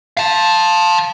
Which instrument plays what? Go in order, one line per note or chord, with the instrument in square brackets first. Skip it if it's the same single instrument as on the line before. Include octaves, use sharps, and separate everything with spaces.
[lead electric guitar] F5 A5